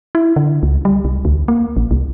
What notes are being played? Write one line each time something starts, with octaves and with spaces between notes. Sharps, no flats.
E4
D3
C#2
G3
C2
D2
A#3
A1
C2